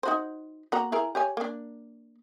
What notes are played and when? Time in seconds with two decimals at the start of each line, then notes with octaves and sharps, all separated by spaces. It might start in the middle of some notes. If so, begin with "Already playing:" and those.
0.03 D#4 F#4 C5
0.72 A#3 F#4 A#5
0.92 E4 G#4 A#4
1.15 G4 C#5 G#5
1.37 A#3 D4